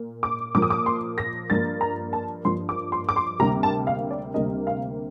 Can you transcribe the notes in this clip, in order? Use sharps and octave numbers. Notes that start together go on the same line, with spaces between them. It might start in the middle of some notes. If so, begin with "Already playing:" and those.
Already playing: A#2 A#3
D6
A#2 F3 A#3 D6
D#6
D6
C6
A#6
G2 F3 A#3 A6
A#5
A5
G2 F3 A#3 C6
D6
C6
D6
C6
D2 C3 G3 A#3 A#5
A5
F5
D5
D2 C3 G3 A#3 D#5
F5